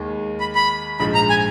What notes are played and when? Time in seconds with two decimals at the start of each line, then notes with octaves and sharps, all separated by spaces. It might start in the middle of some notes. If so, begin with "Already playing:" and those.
Already playing: D#2 D#3 G#3
0.40 B5
0.55 B5
1.00 A#1 G#2 F3 G#3 D#4 B5
1.15 A#5
1.30 G#5